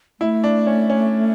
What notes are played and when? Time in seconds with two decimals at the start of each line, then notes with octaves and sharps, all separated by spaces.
0.20 A3 E4
0.44 D4
0.67 C#4
0.90 C#4